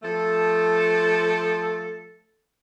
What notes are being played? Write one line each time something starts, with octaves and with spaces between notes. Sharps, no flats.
F3 A3 A4